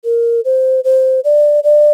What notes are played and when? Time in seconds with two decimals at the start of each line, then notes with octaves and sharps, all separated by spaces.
0.05 A#4
0.45 C5
0.84 C5
1.24 D5
1.64 D5